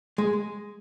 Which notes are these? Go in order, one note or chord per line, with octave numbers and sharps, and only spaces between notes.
G#3